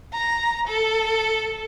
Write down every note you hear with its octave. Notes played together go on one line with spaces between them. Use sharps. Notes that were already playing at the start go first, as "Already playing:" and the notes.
A#5
A4